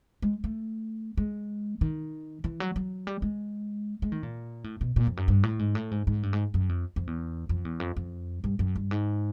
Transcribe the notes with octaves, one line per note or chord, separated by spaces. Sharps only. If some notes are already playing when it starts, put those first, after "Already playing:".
G#3
A3
G#3
D#3
E3
F#3
F#3
G3
G#3
G#3
D#3
A#2
A2
B2
A#2
F2
F#2
G2
A2
G#2
A2
G#2
G#2
G2
G#2
F#2
F2
F2
E2
F2
E2
F2
F2
G2
F#2
G2
G#2